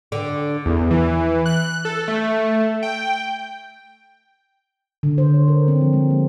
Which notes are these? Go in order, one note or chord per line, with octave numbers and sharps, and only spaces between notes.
D3
E2
E3
F#6
A4
A3
G5
D3
C5
C#5
A#4
C4
F3
G#3
A#3